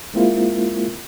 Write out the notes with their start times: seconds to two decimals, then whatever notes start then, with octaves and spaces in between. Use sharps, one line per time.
0.14 G#3 A#3 C4 E4 F4 A#4